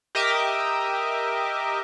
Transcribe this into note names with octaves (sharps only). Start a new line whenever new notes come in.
G4 A#4 D#5 E5 D6